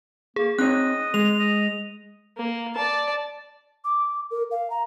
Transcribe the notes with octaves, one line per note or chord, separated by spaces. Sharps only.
A#3 G#4
C4 D#4 C#5 D#5 F#6
G#3 F7
D#5
A#3
D5 A5
D6
A#4
F5
A#5